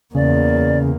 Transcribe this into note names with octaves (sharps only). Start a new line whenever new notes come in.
E2 C#3 A#3 D5